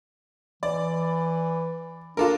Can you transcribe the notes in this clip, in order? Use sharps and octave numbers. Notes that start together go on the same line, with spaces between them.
E3 D5
D4 F4 A4 A#4